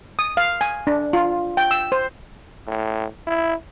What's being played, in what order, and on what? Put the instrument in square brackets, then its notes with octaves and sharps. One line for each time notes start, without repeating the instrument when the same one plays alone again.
[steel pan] D#6
F5
G#5
D4
F4
G5
E6
C5
[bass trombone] A2
E4